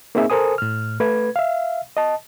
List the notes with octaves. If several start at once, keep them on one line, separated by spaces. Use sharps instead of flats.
A#3 C4 D#4 G#4 E5
A4 A#4 C5 G#5 D#6
A2 F6
A3 B4 G#6
E5 F5
D#5 A5